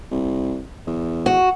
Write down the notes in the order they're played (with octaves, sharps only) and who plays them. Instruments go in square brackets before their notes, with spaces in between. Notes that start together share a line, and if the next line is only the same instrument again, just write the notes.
[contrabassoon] C2
E2
[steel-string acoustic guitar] F#4